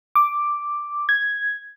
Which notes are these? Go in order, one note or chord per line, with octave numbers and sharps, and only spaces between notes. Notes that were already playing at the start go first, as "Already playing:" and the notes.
D6
G#6